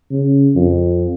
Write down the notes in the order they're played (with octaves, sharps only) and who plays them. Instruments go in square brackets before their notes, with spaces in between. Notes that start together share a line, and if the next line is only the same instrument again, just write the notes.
[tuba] C#3
F2